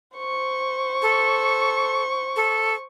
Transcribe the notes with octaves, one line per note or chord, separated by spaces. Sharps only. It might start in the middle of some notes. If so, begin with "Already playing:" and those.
C5 C#6
A4
A4